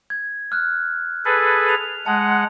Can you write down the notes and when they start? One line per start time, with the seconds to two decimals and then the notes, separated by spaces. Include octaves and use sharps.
0.10 G#6
0.52 F6 F#6
1.25 G#4 A4 B4
1.69 F7
2.06 G#3 F#5 A5